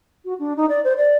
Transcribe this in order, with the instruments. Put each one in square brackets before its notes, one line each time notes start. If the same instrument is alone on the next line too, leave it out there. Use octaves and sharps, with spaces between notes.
[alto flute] F#4
D4
D#4
D5
C5
D5